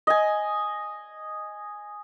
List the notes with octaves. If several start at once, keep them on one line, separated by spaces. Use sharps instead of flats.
D#5 G#5